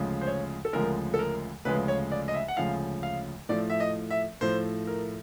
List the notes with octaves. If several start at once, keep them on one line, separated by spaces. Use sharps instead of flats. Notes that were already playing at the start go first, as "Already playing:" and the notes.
Already playing: D2 C#3 F3 G#3
C5
C#5
A4
D2 C#3 F3 G#3 A#4
A4
A#4
D2 C#3 F3 G#3 B4
C#5
D5
D#5
E5
F#5
D2 C#3 F3 G#3 F5
F5
A2 F3 A3 D5
E5
D#5
E5
A2 F3 A3 C5
A#4